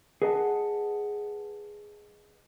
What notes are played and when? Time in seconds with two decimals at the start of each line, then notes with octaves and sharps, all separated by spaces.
0.22 G#4 B4 D#5 F#5 A5